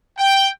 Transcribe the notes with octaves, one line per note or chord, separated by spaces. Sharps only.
G5